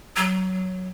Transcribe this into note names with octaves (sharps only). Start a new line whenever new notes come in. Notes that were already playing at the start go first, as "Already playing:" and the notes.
F#3